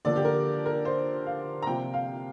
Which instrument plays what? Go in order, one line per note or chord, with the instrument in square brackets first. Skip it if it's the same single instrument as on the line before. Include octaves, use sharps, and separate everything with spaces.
[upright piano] D3 F3 A#3 D5
G4
A#4
A#4
C5
F5
A#5
C3 F3 A#3 G5
F5